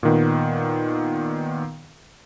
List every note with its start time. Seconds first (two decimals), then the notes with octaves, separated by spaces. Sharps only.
0.03 A#2 D#3 B3